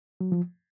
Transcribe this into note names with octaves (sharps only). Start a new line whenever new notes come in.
F#3
F3